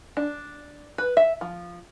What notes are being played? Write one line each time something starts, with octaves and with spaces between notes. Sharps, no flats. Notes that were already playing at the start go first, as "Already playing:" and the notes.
D4
B4
E5
F3